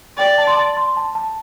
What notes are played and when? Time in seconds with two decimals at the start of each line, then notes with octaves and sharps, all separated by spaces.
0.18 D5 G5
0.38 A5
0.47 C6
0.57 A5
0.77 C6
0.97 A5
1.15 A5